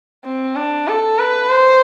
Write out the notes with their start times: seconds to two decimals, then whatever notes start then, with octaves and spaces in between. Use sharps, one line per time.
0.25 C4
0.56 D4
0.88 A4
1.19 B4
1.49 C5